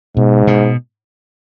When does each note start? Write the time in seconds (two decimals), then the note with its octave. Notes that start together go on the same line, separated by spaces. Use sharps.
0.17 G#2 B2
0.47 B2